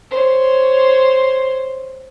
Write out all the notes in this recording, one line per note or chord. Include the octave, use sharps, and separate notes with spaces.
C5 C#5